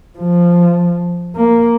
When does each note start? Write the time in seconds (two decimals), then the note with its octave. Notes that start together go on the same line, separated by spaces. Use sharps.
0.19 F3
1.36 A#3